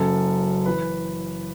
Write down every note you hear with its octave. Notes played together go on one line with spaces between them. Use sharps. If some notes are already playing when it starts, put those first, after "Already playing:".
Already playing: F#1 F#2 F#3 A4
E3 B4